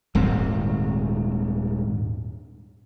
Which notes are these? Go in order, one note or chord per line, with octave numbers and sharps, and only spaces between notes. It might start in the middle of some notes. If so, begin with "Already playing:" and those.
D#1 G#2 D#3 C4